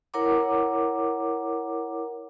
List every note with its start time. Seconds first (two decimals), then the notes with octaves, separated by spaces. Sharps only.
0.14 E4 A#4 C#5 F#5 A#5 D6